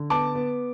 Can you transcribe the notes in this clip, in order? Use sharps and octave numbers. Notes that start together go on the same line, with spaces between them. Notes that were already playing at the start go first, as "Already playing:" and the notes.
Already playing: D3
B3 A5 D6
B3